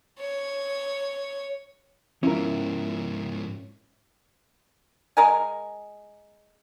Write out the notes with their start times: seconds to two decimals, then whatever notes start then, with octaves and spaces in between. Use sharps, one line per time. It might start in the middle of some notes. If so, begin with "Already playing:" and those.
0.20 C#5
2.23 G#2 F3 C#4 E4 F4 A#4 E5
5.17 G#3 A#4 G#5